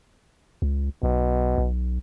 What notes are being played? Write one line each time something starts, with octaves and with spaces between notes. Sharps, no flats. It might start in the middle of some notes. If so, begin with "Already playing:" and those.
C#2
B1 B2
B1